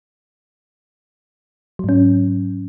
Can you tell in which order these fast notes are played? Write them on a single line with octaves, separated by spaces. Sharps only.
F#3 G#2 C#4